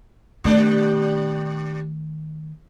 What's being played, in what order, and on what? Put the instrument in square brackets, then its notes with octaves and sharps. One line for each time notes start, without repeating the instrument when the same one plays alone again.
[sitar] A#2 G3 D4 [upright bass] D#3 A3